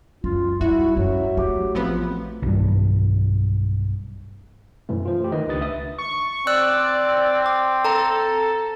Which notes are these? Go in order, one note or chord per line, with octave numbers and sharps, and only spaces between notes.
F#2 F4
G3 E4 F#4 E5
F#2 F#3
A3 G4
A1 F3 B3 C4
B1 G2
F#2 B2 E3 A3
F4 C5
A3 G4
D#3 B4 D#5
C#2 D4 B4 D#6 A6
E5 D#6
C#6
C4 D5 E6 F#6
D6
A4 A5 A#5